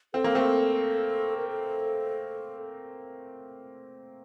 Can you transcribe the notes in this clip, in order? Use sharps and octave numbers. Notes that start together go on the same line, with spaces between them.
C4 A4
A#3
A3 C4
A#4
A4